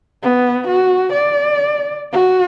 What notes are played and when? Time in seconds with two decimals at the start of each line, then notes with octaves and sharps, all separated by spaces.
0.23 B3
0.68 F#4
1.13 D5
2.12 F#4